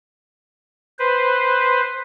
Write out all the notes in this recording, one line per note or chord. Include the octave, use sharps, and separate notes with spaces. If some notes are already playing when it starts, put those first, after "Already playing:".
B4 C5